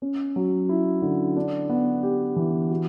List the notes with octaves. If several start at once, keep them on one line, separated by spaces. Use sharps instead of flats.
C#4
F#3
E4
D3
D4
B3
G4
E3
F#4